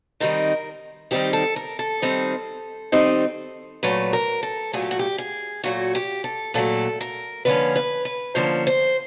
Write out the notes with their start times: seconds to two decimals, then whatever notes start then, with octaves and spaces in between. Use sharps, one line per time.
0.20 D#3 G3 C4 D#4 A#4
1.11 D#3 G3 C4 D#4 G4
1.33 A4
1.56 A#4
1.79 A4
2.02 D#3 G3 C4 D#4
2.92 D#3 G3 C4 D#4
3.83 A#2 F#3 A3 B4
4.13 A#4
4.43 A4
4.73 A#2 F#3 A3 G#4
4.82 G4
4.91 F#4
4.99 G4
5.18 G#4
5.64 A#2 F#3 A3 F#4
5.95 G4
6.24 A4
6.54 A#2 F#3 A3 A4
7.01 A#4
7.45 D3 F3 A#3 C#4 B4
7.76 B4
8.05 B4
8.35 D3 F3 A#3 C#4 C5
8.67 C5